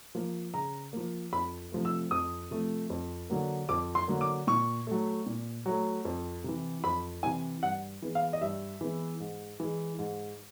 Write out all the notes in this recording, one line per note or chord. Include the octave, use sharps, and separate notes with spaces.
F3 A#3
C#3 A#5
F3 A#3
F2 B5
C3 F3 A3
E6
F2 D#6
C3 F3 A3
F2
D3 F#3 A#3
F2 D6
C6
D3 F#3 A#3
D6
A#2 C#6
F#3 A3
A#2
F#3 A3
F2
C3 E3
F2 B5
C3 E3 G#5
G2 F#5
E3 G#3 B3
F5
D#5
G2 E5
E3 G#3 B3
G#2
E3 G#3
G#2